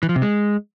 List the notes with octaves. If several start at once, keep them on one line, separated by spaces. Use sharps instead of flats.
E3
F3
C3
G#3